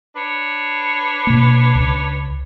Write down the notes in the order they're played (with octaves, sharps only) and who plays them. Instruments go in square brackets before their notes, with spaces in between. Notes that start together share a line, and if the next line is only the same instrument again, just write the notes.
[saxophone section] D4 B4 C#5
[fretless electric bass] B2 A#3
C#2